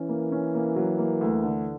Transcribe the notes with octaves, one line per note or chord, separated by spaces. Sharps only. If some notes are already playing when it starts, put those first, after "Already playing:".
Already playing: E3 C#4
A#3
C#4
A#3
F#3
A#3
D2
D3